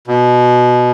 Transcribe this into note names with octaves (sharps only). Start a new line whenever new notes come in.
B2